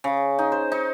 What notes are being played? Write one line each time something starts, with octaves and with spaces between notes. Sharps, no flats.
C#3
D#4
C5
D#4